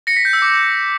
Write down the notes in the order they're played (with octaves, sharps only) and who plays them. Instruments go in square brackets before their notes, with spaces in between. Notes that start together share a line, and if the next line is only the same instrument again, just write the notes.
[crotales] A#6 C#7
B6
G6
E6
D6